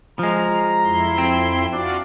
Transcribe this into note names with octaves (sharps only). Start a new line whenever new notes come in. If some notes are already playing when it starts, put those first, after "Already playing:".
F3 G#3 A#5 F6
F2 E4 C6
C4
D4 F4 F#4 D5